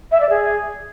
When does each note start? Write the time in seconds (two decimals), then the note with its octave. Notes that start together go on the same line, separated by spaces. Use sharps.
0.11 E5
0.20 D5
0.30 G#4